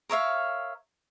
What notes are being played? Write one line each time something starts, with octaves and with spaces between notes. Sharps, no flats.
A#4 C#5 E5 F5